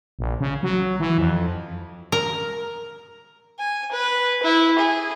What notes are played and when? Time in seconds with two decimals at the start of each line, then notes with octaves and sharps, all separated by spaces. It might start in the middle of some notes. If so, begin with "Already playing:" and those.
0.19 A#1
0.40 C#3
0.63 F#3
1.00 E3
1.18 F2
2.12 A#4
3.59 G#5
3.92 B4
4.43 E4
4.79 G#4